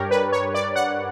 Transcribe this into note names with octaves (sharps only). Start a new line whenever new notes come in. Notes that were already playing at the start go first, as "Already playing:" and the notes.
Already playing: G2 D4 G4 A#4 C#5 D5
B4
C#5
D5
F#5